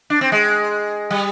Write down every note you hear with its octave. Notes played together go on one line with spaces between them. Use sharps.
D4
C4
G#3
G3